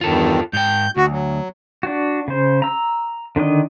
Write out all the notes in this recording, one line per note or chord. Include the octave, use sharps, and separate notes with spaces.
E2 G2 D#3 F4 A4
G#2 G5 G6
D2 F#4
F#3
D4 F#4
C#3 C5
A#5 E6
D3 D#3 D4 D#5